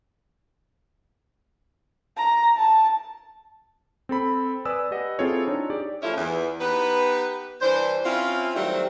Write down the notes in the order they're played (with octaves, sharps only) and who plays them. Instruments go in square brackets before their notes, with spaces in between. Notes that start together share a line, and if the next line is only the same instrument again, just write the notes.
[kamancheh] A#5
A5
[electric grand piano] C4 A4 B5
B4 D5 G#5 D#6 E6
G4 B4 D#5 F#5
C4 E4 F4 G#4 A4 C#5
D4 D#4 C#5
G4 G#4 D5
[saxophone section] E3 F3 A3 C#4 E4 F4
E2
B3 D#4 G4 B4
G2 E3 D4 C5
C4 C#4 E4 F4
D#3 F#3 G3 A3 C4